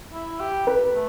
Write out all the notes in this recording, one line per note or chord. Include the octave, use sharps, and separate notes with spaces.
E4
G4
B4
A3